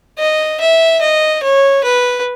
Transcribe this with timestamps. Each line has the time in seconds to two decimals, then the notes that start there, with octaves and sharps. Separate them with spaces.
0.18 D#5
0.60 E5
1.01 D#5
1.43 C#5
1.84 B4